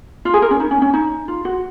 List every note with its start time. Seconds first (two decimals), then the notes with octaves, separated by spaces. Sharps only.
0.25 F4
0.34 G#4
0.42 A#4
0.51 C#4
0.60 D#4
0.71 C#4
0.82 C#4
0.94 D#4
1.28 F4
1.45 F#4